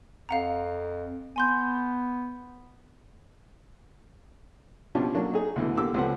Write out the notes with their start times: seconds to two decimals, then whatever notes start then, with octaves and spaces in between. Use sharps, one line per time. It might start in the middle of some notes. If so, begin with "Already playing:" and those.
0.29 F2 F5 F#5 A#5
1.36 B3 G#5 C6 G6
4.95 B2 F3 C#4 D4 F4 G4
5.14 F#3 A#3 D4
5.34 D#4 G#4
5.56 D2 B2 D3 E3
5.77 D3 A#3 G4 D6 E6
5.94 C#2 F3 C4 A4 B4 F#5